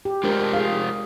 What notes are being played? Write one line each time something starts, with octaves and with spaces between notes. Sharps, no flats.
G4
G#3 D4 F4 G4 A#4 C5
G#4 F5